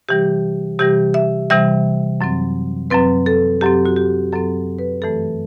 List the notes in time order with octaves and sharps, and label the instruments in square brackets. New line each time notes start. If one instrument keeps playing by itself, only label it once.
[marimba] C3 E3 G3 G4
C3 E3 G3 G4
E5
C3 E3 G3 E5
F#2 F#3 C4
F#2 F#3 C4 B4
A4
F#2 F#3 C4 G4
F#4
G4
F#2 F#3 C4 A4
B4
G2 E3 A3 A4